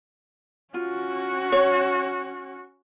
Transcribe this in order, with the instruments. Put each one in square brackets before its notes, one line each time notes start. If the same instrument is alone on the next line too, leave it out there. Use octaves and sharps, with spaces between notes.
[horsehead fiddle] C#4 F#4 [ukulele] F4
[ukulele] C#5